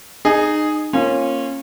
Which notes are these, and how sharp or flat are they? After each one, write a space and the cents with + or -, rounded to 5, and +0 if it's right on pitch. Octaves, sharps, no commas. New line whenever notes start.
D#4 -25 G#4 +0
A#3 -5 C#4 -25 F4 +0